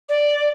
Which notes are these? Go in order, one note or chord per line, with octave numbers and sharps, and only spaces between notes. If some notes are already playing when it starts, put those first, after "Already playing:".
D5